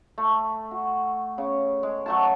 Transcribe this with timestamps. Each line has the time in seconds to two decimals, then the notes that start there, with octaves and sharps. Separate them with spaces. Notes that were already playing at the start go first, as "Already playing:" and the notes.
0.18 A3
0.71 F#4
1.38 C#3
1.83 G#3
2.06 F#3 A3 A5